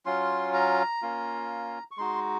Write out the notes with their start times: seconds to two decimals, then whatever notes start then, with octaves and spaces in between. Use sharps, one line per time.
0.06 F#3 C#4 F4 C6
0.54 A#5
1.02 A#3 C#4 F4
1.91 C#6
1.98 G#3 D#4 F#4 C6